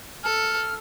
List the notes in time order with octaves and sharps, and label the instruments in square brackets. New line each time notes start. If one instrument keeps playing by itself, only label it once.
[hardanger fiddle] A4 [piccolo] F6